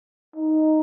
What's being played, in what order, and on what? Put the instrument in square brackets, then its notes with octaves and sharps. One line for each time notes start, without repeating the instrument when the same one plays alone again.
[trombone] D#4